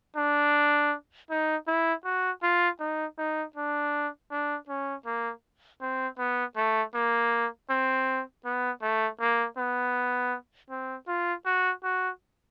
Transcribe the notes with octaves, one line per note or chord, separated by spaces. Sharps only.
D4
D#4
E4
F#4
F4
D#4
D#4
D4
D4
C#4
A#3
C4
B3
A3
A#3
C4
B3
A3
A#3
B3
C4
F4
F#4
F#4